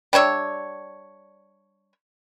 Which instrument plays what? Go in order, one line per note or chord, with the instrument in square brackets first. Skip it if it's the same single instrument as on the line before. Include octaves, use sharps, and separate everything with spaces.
[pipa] G3 D4 C#5 E5